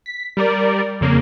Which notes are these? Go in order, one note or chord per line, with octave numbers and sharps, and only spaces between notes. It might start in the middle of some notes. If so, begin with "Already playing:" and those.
B6
G3 A#4 D5
F2 C#3 A#3